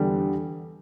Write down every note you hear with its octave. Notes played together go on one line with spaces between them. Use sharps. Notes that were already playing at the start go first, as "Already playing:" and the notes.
Already playing: E2 D3 G3